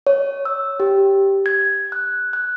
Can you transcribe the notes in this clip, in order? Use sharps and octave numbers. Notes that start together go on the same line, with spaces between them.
C#5
E6
G4
G#6
F#6
F#6